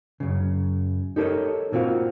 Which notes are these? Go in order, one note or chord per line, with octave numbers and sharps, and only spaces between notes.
F#2 C#3
D#4 G4 A4 A#4 C#5 D#5
A#2 A#3 C4 F4 F#4 F5